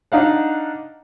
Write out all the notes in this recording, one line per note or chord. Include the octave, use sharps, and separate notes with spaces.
D4 D#4 F5 F#5